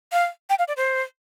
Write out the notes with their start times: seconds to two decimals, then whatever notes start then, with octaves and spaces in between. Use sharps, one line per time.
0.12 F5
0.50 G5
0.59 F5
0.68 D5
0.77 C5